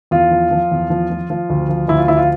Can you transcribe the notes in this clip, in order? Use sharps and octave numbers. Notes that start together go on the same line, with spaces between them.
E2 F4
F3
F3
E2
F3
F3
F3
D2
F3
D2 E4
F4
F3 E4
F4